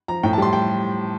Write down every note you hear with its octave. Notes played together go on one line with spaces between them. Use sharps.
F3 A#5
A2 G5
A5
G3 C6
G5